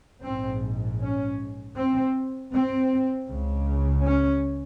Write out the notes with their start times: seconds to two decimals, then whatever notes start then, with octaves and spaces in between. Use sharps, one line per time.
0.24 A#1 G#2 C4
1.01 C#4
1.76 C4
2.53 C4
3.29 C#2 C#3
4.04 C#4